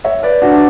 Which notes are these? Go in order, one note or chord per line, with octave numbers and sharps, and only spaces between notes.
C#5 E5
B4 D5
D4 F#4
D4